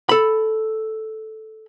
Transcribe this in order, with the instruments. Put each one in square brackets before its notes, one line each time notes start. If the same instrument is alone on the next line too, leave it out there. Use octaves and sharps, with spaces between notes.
[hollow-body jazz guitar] A4 B5